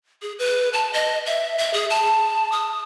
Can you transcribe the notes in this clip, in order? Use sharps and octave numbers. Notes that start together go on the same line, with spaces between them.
G#4
B4
A5
D#5
E5
E5
G#4
A5
D#6